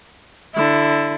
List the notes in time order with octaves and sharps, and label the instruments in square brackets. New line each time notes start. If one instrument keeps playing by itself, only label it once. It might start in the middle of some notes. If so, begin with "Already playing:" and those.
[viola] D3 E4